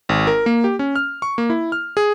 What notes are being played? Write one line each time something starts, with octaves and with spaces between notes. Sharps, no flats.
G#1
A#4
A#3
G4
C#4
F6
C#6
A#3
E4
F6
G#4